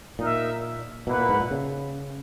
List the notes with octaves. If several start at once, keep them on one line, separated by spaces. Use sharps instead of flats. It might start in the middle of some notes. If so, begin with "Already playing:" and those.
A#2 D#4 A#4 E5
B2 A#3 E4 B4 F#5
A#2
G#2
A#2
C#3